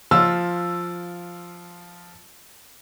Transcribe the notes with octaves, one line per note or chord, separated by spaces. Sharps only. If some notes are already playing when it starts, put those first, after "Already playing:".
F3 F4 E6